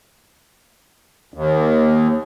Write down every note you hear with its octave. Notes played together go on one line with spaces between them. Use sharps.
D#2